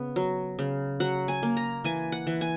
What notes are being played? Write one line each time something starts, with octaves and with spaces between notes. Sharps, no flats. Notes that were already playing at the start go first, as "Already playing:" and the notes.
Already playing: C#3 B3
F#3
C#3
F#3 F#5
G#5
A#3
A#5
E3 G#5
F#5
E3
G#5